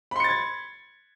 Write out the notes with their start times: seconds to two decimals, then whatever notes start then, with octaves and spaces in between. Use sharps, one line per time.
0.11 B5
0.16 C6
0.20 C#7
0.24 A6
0.29 G#6